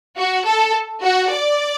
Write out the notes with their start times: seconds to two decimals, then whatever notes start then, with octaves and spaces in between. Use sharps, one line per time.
0.19 F#4
0.46 A4
1.03 F#4
1.31 D5